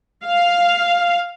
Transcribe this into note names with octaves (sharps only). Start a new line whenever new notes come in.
F5